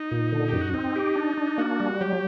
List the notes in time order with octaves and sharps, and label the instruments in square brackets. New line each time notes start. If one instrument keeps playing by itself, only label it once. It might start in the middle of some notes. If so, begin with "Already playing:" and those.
Already playing: [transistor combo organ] D#4
[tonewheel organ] A#2
D3
[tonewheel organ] F#2 [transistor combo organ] G4
[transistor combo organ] F#4
[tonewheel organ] C4 [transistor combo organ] D#4
[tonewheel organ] G4
D4
D4
[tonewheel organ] A#3 [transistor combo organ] F#4
[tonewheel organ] G3
[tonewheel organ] F#3 [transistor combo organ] G4